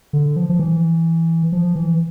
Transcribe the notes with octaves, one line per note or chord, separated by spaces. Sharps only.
D3
F3
F3
E3
F3
E3